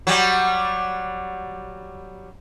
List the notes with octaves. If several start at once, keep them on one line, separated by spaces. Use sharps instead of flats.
F#3 G3